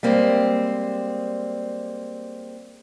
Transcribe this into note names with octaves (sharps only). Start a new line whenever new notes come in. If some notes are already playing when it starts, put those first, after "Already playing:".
G3 G#3 A#3 C4